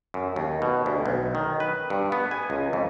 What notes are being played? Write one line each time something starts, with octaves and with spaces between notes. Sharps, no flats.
F#2
D#2
B2
D2
B1
D#3
B4
G2
B3
G#5
C#2
F2